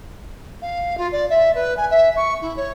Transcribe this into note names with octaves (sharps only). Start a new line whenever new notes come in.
F5
F4
D5
E5
B4
G#5
E5
C#6
E4
C#5